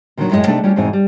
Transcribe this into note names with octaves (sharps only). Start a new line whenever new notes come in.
A#2 D3 D#3 F3 F#3
F#2 A2 G#3 G#4 D#5
C3 A3 C4 D4 D#4 A4
G3 C#4 D4 F4
E2 G#2 B2 C4 D#4 G#5
G3